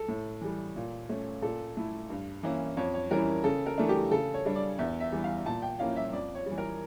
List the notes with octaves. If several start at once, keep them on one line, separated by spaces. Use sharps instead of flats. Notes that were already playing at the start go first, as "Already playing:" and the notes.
Already playing: A4
A2
E3 G3
A#2
A3 C#4
A#2 A4
A3 E4
G2
E3 A#3 C#4 E4
F2 C#5
C#5
E3 G3 C#4 E4 A#4
C#3 A4
A#4
E3 A3 D4
G4
C#3 A4
C#5
G3 D4
D5
E2 E5
E5
E3 G3
F5
A#2 A5
G5
F3 A#3 C#4 E4 F5
E5
F2 D5
C#5
G3
E3
A#4